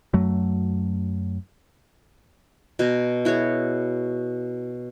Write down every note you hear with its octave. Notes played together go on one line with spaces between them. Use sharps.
F#2 F#3 A3
B2 G#5 A#5
E4 F#4 G#4 C#5